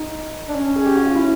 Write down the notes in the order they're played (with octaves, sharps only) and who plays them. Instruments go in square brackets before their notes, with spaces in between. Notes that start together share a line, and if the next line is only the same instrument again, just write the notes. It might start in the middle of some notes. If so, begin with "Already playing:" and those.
Already playing: [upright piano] D#4
[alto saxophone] D4
C#4
[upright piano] G#4
G4
F#4
F4
E4